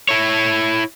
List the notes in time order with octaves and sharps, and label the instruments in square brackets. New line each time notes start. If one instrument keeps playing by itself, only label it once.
[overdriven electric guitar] E4 C#5